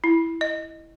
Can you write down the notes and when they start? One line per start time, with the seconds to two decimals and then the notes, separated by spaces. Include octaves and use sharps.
0.04 E4
0.41 D#5